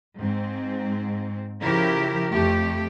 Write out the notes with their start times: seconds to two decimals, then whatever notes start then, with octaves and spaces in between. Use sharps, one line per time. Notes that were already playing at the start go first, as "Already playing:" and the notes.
0.18 G#2 C4
1.61 C#3 F3 E4 G4 A#4
2.32 F2 A3 G4